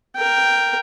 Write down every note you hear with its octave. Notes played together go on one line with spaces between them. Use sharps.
A#4 G5